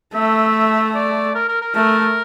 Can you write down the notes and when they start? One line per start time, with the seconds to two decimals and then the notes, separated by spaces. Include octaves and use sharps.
0.15 A3 E5
0.95 D5
1.35 A#4
1.48 A#4
1.62 A#4
1.75 A3 A#4